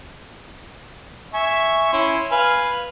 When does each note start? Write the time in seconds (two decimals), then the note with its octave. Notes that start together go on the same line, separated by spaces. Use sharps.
1.34 E5 G#5 C#6
1.93 C#4 E4 C6
2.32 B4 F5 G#5